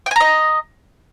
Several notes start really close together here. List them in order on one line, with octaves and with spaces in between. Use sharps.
G5 G#5 A#5 D#5